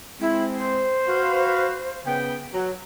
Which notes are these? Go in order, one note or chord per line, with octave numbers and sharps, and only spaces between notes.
G#3 C4 E4
C5
F#4 B4 F5
C#3 B3 G5
F#3